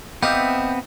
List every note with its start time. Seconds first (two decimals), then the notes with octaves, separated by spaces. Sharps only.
0.23 B3 C4 D#4 G4 E5 F5